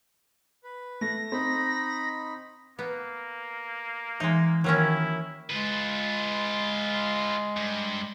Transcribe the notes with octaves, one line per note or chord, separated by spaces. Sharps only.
B4
A3 A#6
C4 D#4 B5
A#3 B3
E3 G#3 D#4
D#3 F#3 A#3 C#4 E4
G#3 F4 B4
G2